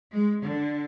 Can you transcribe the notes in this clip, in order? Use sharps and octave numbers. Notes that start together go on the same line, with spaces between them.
G#3
D3